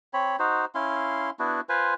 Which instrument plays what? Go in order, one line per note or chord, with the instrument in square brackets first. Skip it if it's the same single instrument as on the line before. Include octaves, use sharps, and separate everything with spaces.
[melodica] C4 C#5 B5
D#4 F#4 C5
C#4 E4 F5 C6
B3 D4 E4 F#4
F4 B4 C5 G#5